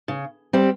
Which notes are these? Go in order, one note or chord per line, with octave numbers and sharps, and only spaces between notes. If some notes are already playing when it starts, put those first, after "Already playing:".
C#3
G3 C4 G4